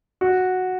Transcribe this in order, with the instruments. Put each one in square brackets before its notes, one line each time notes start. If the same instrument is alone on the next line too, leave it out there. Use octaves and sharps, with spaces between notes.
[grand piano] F#4